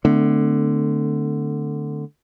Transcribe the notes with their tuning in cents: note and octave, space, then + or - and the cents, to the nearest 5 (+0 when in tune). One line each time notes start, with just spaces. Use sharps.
D3 +15 A3 +0 C4 -45